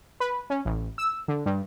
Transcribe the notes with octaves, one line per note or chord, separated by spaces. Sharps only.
B4
C#4
A1
E6
D3
G2